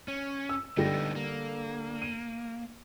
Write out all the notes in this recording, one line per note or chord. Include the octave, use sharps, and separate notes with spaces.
C#4
E6
D3 G3 B3 D#4 G4 A#6
A#3
D#7